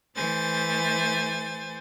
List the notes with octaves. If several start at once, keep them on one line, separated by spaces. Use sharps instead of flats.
E3 A3 C5 G#5 A6